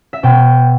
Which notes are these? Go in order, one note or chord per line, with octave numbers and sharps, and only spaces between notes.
E5
B2 G5